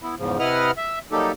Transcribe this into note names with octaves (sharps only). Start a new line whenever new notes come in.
B3 E4
E2 G#2 C#3 F3
C3 E4 B4 D#5 F#5 F6
E5
F#3 G3 A#3 D#4 G4 A4